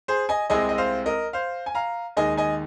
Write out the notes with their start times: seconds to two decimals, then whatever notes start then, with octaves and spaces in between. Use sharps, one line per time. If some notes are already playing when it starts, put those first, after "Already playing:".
0.08 G#4 C5
0.29 D#5 G#5
0.50 C2 C3 G#3 C4 D#5 G#5
0.69 D#5
0.78 C5 F5
1.06 A#4 D#5
1.33 C5 F5
1.66 G#5
1.75 F5 A#5
2.17 D#2 D#3 G#3 D#5 G#5
2.37 D#5 G#5